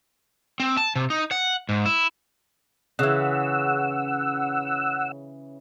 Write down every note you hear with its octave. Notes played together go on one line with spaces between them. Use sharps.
C4
A5
C3
D#4
F#5
G#2
E4
C#3 E3 F#5 E6